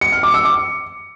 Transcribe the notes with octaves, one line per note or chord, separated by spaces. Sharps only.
C#7
F6
D6
E6
D6